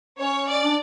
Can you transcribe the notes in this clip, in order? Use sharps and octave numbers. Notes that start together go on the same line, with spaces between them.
C#4 C#5
D5
D4